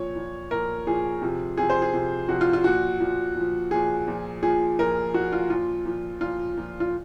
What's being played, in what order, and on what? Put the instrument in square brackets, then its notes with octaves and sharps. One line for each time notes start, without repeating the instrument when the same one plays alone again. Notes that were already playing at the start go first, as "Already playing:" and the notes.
Already playing: [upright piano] A#2 F3 C#5
A#2 F3
A#2 F3 A#4
A#2 F3 G#4
C3 F3
C3 F3 G#4
C5
G#4
C3 F3
C3 F3 F#4
F4
F4
A#2 F3 F#4
A#2 F3
A#2
F3
A#2 F3 G#4
A#2 F3
A#2 F3 G#4
A#2 F3 A#4
A#2 F3 F#4
F4
A#2 F3 F4
A#2 F3
A#2 F3 F4
A#2 F3
F4